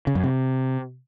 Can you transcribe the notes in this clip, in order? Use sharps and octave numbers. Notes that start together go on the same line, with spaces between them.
C#3
F#2
C3